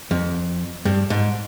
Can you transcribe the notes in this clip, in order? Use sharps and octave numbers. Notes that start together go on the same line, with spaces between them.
F2
G2
G#2